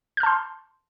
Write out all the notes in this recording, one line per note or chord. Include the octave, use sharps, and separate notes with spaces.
A5 C6 F6 G6